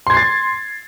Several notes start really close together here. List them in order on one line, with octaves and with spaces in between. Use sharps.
C6 G#6 C7 A6